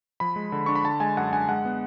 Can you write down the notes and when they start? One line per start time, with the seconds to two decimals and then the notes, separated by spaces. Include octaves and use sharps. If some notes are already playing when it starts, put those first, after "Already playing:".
0.20 F3 B5
0.36 G#3
0.52 D3
0.66 D4 C#6
0.75 B5
0.84 D3 A5
1.00 G#3 G#5
1.17 F#2 F#5
1.33 D4 G#5
1.48 G#3 F#5
1.65 B3